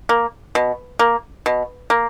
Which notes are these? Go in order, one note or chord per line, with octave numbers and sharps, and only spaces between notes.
A#3
B2
A#3
B2
A#3